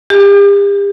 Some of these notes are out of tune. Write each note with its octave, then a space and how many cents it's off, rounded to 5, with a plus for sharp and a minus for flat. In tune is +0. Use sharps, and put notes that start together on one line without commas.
G4 +40